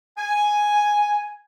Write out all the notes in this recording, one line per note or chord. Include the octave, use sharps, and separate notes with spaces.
G#5